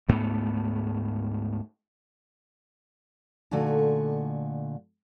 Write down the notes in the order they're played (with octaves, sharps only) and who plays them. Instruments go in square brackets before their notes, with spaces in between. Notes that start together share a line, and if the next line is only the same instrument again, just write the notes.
[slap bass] D2 G#2 A3 B3
[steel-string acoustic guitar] A#2 D3 A3 D#4 F#4 G#5